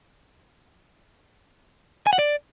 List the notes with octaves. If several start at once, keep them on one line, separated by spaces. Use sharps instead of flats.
G#5
F#5
D5